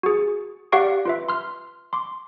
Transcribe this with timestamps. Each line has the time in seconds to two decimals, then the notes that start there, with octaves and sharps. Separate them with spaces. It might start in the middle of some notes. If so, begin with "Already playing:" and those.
0.03 F#4 G#4
0.72 G4 D5 F5 F#5 C#6 D7
1.05 F4 B4 E5
1.29 C6 F6
1.93 C6 D6